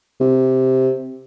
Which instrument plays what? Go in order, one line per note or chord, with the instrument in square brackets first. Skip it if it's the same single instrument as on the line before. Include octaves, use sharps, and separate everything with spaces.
[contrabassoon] C3